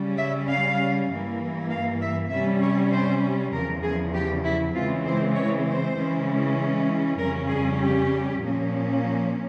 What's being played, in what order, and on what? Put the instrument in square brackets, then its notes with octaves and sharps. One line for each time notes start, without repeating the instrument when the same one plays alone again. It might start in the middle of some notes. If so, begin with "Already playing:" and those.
Already playing: [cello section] C#3 G3 C#4
E5
F5
G2 E3 A#3
F5
E5
C3 G3 C#4 E5
C#5
C5
E2 C#3 F3 A#4
G#4
G4
E4
C#3 E3 G#3 C4 F4
C5
C#5
C5
C#3 E3 G#3 C#4
F2 C#3 G3 C#4 A#4
G#4
G4
A#2 F3 A#3 C#4